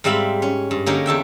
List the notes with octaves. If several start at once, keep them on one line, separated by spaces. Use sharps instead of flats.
G#2 G3 C4 E5 F5 B5
C#4
G2
D3 A#3 C#4 D#4 G4 G#4
E2 A4 E5 G5